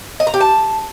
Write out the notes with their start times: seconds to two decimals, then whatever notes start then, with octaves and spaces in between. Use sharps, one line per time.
0.20 D#5
0.27 A#5
0.34 G4
0.41 A5